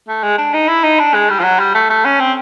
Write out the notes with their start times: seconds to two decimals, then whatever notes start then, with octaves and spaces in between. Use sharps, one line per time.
0.08 A3
0.23 G#3
0.38 D4
0.54 D#4
0.68 E4
0.84 D#4
0.99 D4
1.14 G#3
1.30 G3
1.40 F3
1.44 F#3
1.59 G3
1.75 A3
1.89 A3
2.05 C#4
2.20 C4